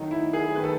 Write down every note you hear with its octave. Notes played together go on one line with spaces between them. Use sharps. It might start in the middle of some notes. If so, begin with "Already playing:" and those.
Already playing: D#3 F#3 A3 D#4
E4
G#4
D#3 A3 B4
A4